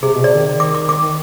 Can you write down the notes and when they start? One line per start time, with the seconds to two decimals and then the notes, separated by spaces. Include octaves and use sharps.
0.02 C3 G#4
0.14 B2
0.24 C3 D5
0.35 D#3
0.46 D#3
0.60 D6
0.75 D6
0.89 D6